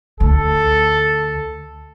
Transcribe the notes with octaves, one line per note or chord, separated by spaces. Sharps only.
D2 A4